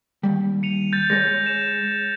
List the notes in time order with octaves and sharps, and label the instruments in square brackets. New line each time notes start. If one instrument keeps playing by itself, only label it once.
[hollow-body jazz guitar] D#2 G3
[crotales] C#7 D#7 F7
G6 A6
[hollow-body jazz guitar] G#3 G#4 C#5 [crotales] A#6
[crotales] E7